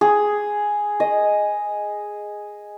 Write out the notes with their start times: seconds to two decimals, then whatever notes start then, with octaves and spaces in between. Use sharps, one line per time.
0.01 G#4
1.00 D#5